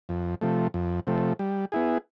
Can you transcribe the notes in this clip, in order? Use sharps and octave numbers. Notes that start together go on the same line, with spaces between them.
F2
C3 F3 A3
F2
C3 F3 A3
G3
B3 E4 G#4